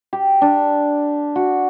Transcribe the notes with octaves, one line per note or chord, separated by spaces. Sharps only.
G4
D4
F#4